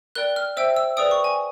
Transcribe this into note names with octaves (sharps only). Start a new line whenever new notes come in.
A#4 D5 G5 F#6
F6
C5 E5 G5 E6
E6
G#4 B4 D5 G5 D#6
C#6
G#5